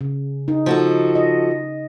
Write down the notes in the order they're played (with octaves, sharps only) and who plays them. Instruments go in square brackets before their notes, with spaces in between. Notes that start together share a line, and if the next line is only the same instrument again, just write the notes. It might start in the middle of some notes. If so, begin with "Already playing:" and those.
[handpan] C#3
D#4
[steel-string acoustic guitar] F3 F#4 A4
[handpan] D#5